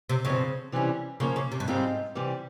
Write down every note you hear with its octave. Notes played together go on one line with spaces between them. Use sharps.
C3
G2 C#3 F3 C4
C3 E3 G3 C#4 E4
C#3 F3 A#3 C#4
C#3
C3
G2
G#2 G3 C4 F4 C5
C3 E3 G3